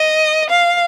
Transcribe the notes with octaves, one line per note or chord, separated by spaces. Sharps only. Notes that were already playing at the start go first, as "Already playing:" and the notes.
Already playing: D#5
F5